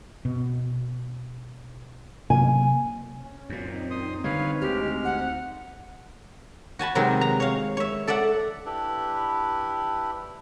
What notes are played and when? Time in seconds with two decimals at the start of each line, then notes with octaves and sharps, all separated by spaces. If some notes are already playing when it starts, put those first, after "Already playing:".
0.25 B2
2.30 C3 F#3 A#3 G#5
3.14 C#4
3.50 F#2 A#2 C4 D#4
3.90 C6 D#6
4.24 D3 D#3 G3 B4 C#5 F5
4.61 D2 G#3 G4 F6
5.05 F#5
6.79 F#4 G#5 A5 B5
6.95 C3 D#3 F#3 G#3 B3 D#4
7.21 A#5
7.40 C#5 F5
7.77 C#5 E5
8.07 A4 D5 E5 F#5
8.66 D4 E4 G4 B4